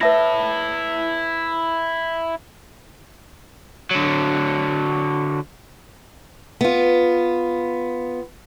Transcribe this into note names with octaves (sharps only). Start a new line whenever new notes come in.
E4 B4 E5 A5 A#6
D3 F#3
B3 F4